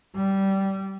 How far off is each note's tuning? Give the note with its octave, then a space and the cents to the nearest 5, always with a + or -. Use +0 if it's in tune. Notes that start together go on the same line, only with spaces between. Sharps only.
G3 -15